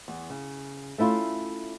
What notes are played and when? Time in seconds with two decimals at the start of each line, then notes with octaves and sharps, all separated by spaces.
0.08 E2
0.30 C#3
0.98 A3 C#4 E4 F4